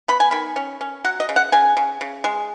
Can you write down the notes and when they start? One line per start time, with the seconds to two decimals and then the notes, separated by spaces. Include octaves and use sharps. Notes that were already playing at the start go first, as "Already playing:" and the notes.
0.08 B3 B5
0.20 G#5
0.31 D#3 B5
0.56 C#4
0.81 C#4
1.04 F#3 F#5
1.20 D#5
1.29 C#3
1.36 F#5
1.52 C#3 G#5
1.77 C#3
2.01 C#3
2.24 G#3